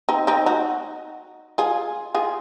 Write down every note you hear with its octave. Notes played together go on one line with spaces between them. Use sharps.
C4 D#4
C4 D#4
D#4 F#4
F4 G#4
F4 G#4